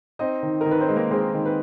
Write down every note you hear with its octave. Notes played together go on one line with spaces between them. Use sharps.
C4 D#4 D#5
D#3
A#4
D#3
B4
C4 C5
G#3
A#3 A#4
G#3 C4 G#4
D#3
B4